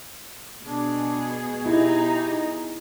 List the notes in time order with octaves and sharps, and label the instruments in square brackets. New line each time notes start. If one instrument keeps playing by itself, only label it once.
[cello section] B2 G#4 [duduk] D4
[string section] D#4 [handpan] E4 [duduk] G4